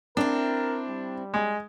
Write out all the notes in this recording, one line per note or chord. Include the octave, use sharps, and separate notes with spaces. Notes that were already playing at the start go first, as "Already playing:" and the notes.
C4 D4 E4 A#4
G3
G#3